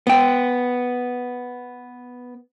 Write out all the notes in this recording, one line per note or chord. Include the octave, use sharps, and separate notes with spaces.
B3 G5